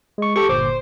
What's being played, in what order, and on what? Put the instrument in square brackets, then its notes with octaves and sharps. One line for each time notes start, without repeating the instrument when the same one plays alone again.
[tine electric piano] G#3 C#6
[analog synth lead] G4 [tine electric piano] A4 C#6
[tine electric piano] G1 A#2 D6 [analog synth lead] C5